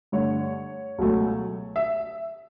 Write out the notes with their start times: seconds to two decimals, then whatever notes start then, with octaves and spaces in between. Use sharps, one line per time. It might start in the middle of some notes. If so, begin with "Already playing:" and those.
0.12 G2 D3 A3 C#5
0.98 C#2 B2 F#3 A3
1.76 E5